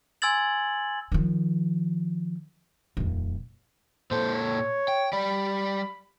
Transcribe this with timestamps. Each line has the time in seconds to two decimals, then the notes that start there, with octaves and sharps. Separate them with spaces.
0.22 G#5 C6 E6 G#6 A6 F#7
1.12 D#3 F3
2.97 D#1 F2
4.11 A#2 A4 C5
4.35 C#5
4.88 G5
5.13 G3 D5 B5